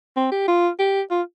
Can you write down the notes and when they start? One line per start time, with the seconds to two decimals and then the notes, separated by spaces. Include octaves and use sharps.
0.17 C4
0.32 G4
0.48 F4
0.79 G4
1.11 F4